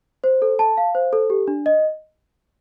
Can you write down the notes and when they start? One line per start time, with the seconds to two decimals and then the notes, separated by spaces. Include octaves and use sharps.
0.24 C5
0.42 A4
0.59 A5
0.77 F5
0.95 C5
1.13 A4
1.30 G4
1.48 D4
1.66 D#5